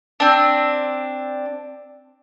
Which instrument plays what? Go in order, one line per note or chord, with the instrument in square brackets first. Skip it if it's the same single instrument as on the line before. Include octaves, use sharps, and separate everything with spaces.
[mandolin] C4 D4